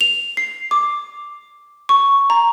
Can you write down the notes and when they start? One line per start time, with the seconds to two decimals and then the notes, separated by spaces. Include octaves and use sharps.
0.01 F7
0.37 C7
0.71 D6
1.89 C#6
2.30 A#5